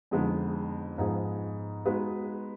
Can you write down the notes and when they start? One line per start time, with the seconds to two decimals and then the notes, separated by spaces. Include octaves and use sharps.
0.11 F2 D3 G#3 B3 D#4
0.98 G#2 F3 B3 D#4 G#4
1.85 G#3 B3 D#4 F#4 B4